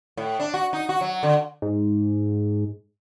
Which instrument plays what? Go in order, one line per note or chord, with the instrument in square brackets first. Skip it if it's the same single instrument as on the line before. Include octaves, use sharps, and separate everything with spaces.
[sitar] A2
D4
F#4
D#4
F#4
F#3
D3
[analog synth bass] G#2